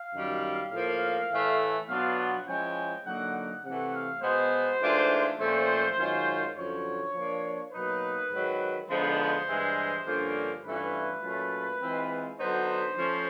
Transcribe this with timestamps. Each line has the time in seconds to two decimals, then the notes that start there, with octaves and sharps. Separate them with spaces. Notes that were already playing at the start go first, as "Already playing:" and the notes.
Already playing: F5
0.14 F#2 D#3 G3
0.72 A2 F3 A#3
1.31 A2 E3 A3
1.89 B2 F#3 B3 D4 F4 F5
2.18 F#5
2.47 F3 G#3 C#4 E4 G5
3.05 D3 F#3 A#3 D#4 F#5
3.35 F#5
3.65 C3 E3 A3 F#5
3.93 F5
4.22 B2 G#3 B3 C5
4.80 G#2 E3 A3 D4 F4
5.39 A#2 F3 A3 C#4 C5
5.97 F#2 D#3 G#3 C#4 F4
6.55 F#2 D3 F3 C#5
7.14 F3 A#3 D4 F4
7.72 B2 F#3 A#3 D#4 B4
8.30 G#2 D#3 F#3
8.89 D3 F3 G#3 B3 D#4 C5
9.48 G2 E3 G#3
10.05 G2 D3 F3 A#3 C#4
10.63 G2 E3 A3 C#4 F4 B4
11.22 A#2 F#3 A3 C#4 F4
11.81 E3 G#3 C4 F4
12.39 D3 F#3 B3 D#4 C5
12.98 F3 A3 C#4